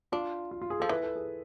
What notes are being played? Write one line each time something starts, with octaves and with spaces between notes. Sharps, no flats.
D4 F4
F4
F4
G#4
F3 A4
E3 B4
A4
G#4